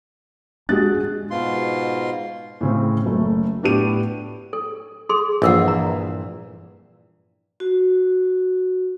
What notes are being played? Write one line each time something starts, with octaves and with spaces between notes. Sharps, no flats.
G#3 D4 F#4 G4 F#6 A6
G#2 B2 F4 C6
A2 C#3 C4
F#1 A3
A2 B3 D4 G4 D#7
A4
G#4 A4 C6
A#1 G2 A#2 E3 A4 A#4 F#5
A#5
F#4